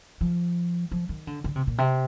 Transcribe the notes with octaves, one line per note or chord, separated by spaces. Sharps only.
F3
F3
D#3
D3
D3
C3
A#2
C3